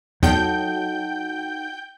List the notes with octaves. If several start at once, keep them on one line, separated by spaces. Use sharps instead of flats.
E2 F#3 D#4 F#4 A4 G5 G6